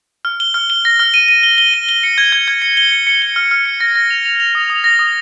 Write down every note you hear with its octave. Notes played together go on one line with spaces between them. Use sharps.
F6
G7
F6
G7
A#6
F6
D#7
D#7
G7
G7
D#7
G7
C#7
G#6
G#6
G#6
C#7
G7
C#7
C#7
G7
F6
F6
C#7
A#6
A#6
F7
F7
F7
D#6
D#6
A#6
D#6